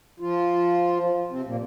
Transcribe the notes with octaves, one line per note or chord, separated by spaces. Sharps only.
F3 F4
C3 C4
A#2 A#3